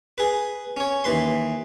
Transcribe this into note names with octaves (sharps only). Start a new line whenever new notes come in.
G#4 B4
C#4 C#5
D#2 E3 B4 C6